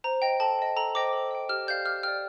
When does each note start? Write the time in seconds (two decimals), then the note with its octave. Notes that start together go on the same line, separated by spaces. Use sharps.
0.04 C5 A#5
0.22 D#5 G5
0.40 A4 A5
0.59 D#5 G5
0.76 A4 A#5
0.95 C5 D#5 G5 D6
1.13 A4
1.31 D#5 G5
1.49 G4 F6
1.67 D5 F5 G6
1.85 G4 F6
2.03 D5 G5 F6